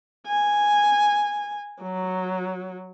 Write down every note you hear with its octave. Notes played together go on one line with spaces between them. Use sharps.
G#5
F#3